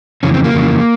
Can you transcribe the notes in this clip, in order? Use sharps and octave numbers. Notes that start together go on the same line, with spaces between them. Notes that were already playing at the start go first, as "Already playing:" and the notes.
F2 C#3 E3 C#4
C4
A#3
F2 C#3 E3